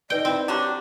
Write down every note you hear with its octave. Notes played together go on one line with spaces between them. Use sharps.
D#4 B4 D5 D#5 G5
C4 E4
D3 F#3 D4 G4 D6